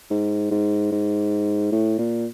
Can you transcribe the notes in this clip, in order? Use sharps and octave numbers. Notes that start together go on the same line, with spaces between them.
G#2
G#2
G#2
A2
A#2